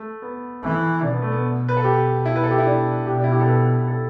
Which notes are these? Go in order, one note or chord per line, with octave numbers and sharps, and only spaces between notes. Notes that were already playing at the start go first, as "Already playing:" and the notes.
Already playing: A3
B3
E3 A3
B2 D4
B3
A3
B3
B4
A4
G4
E4
B4
A4
G4
E4
D4
B2 G4
D4
E4
G4
A4
B4
A4